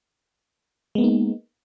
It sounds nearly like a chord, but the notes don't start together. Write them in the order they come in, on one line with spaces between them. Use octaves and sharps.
G#3 B3 A#3 D#4